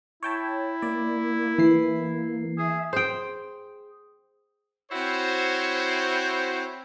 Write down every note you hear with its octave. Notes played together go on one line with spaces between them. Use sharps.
E4 C#5 G5 A5
A#3 D5
E3 C7
G#4 E5
G#4 C5 G5 D#6
C4 E4 F#4 C5 C#5